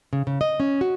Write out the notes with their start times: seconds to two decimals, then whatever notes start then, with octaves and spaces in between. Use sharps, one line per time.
0.13 C#3
0.27 C#3
0.41 D#5
0.60 C#4
0.81 F#4